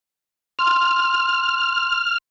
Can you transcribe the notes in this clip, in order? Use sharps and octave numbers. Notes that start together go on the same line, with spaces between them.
C6 F6